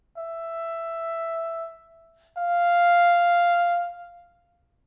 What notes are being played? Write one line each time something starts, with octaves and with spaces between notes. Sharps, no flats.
E5
F5